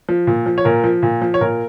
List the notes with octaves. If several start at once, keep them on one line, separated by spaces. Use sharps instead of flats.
F3
A#2
F3
C#5
A#2 A#4
F3
A#2
F3
C#5
A#2 A#4